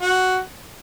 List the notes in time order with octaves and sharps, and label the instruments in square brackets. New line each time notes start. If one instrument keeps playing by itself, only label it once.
[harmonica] F#4